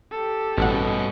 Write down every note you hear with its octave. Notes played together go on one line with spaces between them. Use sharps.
G4 A4
A1 G2 B2 C#4 F#5